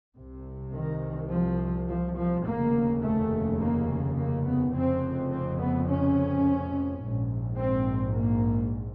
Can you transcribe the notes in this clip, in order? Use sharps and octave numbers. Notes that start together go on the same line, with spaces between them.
C2 C3
D#3
F3
F3
F3
F1 D#2 C#3 A#3
A3
A#3
A#3
B3
F1 F2 C#3 C4
C4
B3
C#4
A#1 G#2
C4
A#3